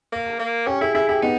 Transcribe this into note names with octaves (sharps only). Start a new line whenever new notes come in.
A#3
A#3
C#4 G4
E4 G#4
E4 G#4
E4 G4
B3 D#4